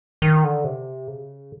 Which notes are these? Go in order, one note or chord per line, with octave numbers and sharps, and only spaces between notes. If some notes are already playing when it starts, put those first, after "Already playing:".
D#3
D3
C3
C#3